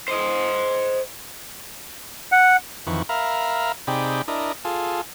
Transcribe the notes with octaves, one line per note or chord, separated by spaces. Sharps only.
C5 D#5
F#5
F2 D#3 E3 B4 C#6
A#4 E5 F5 A#5 B5
C3 D#4 G#4 D5 G5 B5
D4 E4 A#4 D#5
F4 G#4 A4